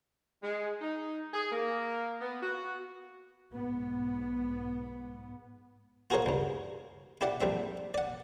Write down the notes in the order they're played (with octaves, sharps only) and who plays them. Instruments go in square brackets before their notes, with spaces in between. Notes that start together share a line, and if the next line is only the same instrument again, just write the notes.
[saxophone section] G#3
D#4
G#4
A#3
B3
F#4
[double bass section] B1 G#2 B3
[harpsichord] F4 F#4 G#4 A#4 C5 C#5
C#2 G2
E4 G4 D5 F#5
A#1 G3 C4 E5
D5 F#5